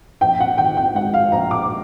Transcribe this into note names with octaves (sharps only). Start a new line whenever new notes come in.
A#1 G5
F#5
D#3 G5
G5
G#2 F#5
F5
A#1 A#5
D6